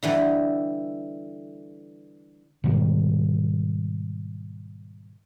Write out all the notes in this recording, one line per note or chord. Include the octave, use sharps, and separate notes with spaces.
D3 E3 G3
G#2 B2 D#3 G3